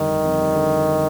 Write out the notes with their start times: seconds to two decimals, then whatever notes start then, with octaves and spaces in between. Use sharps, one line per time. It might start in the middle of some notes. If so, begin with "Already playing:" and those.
Already playing: F2 D3 D#3 G3
0.09 G1
0.24 F2
0.40 G3
0.55 D3